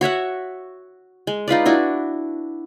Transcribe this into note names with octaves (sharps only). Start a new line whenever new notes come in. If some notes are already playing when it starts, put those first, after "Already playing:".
F#4 C#5 E5 F#5
G#3
D#4 F4 B4 D5
D4 E4 F#4